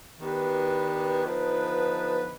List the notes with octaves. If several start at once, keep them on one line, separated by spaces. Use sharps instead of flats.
D#3 B3 D4 G4 B4
D3 F3 B3 D#4 B4